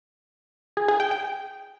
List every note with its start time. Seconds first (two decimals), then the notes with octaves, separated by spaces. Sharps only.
0.77 G#4
0.88 G#4
1.00 G5
1.11 G5